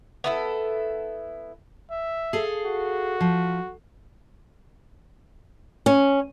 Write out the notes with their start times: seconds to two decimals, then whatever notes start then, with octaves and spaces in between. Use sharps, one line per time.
0.24 B3 E4 A4
1.91 E5
2.33 G#4 A4 F5
2.65 F#4
3.21 F3
5.86 C#4